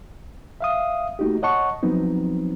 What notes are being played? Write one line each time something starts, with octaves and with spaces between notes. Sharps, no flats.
E5 F5 D#6
A3 A#3 D#4 F#4 G4
C#5 D#5 F#5 A5 C#6
F3 F#3 B3 C4 D#4